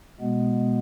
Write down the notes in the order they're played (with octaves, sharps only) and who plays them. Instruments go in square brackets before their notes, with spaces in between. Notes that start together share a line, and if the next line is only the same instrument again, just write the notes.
[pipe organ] B2 G#3 B3